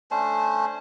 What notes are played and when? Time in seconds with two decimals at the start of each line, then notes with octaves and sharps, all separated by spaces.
0.11 A3 C#4 D4 C5